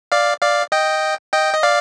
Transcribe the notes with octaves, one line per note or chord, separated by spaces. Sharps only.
D5 F5
D5 F5
D#5 G5
D#5 G5
D#5
D5 F5